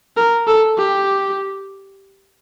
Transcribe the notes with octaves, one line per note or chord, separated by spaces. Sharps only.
A#4
A4
G4